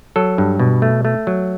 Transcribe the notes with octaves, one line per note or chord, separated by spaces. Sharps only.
F#3 A4
G2
B2
A3
A3
F#3